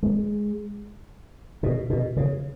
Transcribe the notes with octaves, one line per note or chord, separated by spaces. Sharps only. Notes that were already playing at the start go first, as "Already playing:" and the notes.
G#3
B2
B2
C#3